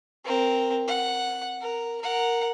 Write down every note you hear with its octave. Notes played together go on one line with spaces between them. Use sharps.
C4 A#4
F#5
A#4
A#4 F#5